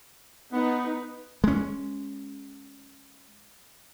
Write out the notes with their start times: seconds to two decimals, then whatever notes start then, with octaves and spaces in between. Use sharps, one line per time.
0.52 B3 D#4 B4
1.44 G#3 C#4